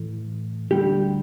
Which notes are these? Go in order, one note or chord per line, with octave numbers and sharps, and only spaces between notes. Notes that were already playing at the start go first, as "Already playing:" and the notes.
Already playing: A2 E3 A3
D2 D3 G3 G4